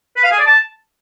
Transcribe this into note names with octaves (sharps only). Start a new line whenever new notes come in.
B4
F5
G#4
D5
A5